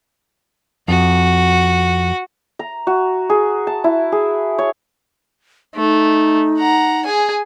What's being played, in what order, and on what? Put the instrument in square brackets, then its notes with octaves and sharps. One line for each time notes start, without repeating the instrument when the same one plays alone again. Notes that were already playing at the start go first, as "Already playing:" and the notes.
[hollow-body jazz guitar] F2 [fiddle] F#4
[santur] A#5
F#4
G#4
A5
E4
G#4
C#5
[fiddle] A3 [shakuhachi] D#4
[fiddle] F#5 A#5
G#4 G#5